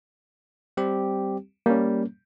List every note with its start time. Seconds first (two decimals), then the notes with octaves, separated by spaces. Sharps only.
0.77 G3 C4 G4
1.66 G3 A#3 C#4